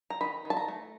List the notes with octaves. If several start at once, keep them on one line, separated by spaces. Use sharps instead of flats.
A#5
D#3 B5
D#3
A5
A#5
A3